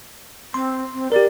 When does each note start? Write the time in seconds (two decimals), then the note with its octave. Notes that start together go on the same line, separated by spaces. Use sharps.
0.54 C4 C6
0.93 C4
1.12 G4 A#4 D5